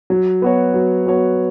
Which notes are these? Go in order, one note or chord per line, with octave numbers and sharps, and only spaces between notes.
F#3
B3 F#4 C#5
F#3
B3 F#4 C#5